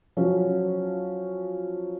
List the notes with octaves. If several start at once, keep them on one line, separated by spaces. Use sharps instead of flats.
F3 F#3 C#4